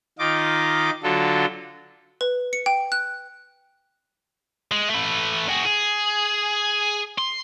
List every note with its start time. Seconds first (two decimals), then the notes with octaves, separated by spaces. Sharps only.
0.19 D#3 D#4 F4 D6
1.03 D3 F#3 F4 A4
2.21 B4
2.53 C#7
2.66 G5
2.92 F#6
4.72 G#3
4.90 A3 B4
5.49 F#4 G#4
5.65 G#4
7.18 C6